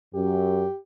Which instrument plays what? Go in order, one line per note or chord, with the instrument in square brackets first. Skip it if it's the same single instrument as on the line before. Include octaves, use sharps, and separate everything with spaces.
[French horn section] F#2 [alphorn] G4